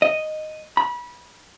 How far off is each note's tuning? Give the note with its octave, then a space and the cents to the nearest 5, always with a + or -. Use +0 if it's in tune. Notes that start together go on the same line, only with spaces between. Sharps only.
D#5 -5
B5 -25